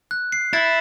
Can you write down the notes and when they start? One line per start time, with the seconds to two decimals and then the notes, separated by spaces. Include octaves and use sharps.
0.11 F#6
0.32 C7
0.53 E4 A6